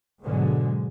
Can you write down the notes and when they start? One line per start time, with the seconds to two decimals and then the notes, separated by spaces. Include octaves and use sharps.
0.24 G#2 B2 D3 F#3 G#3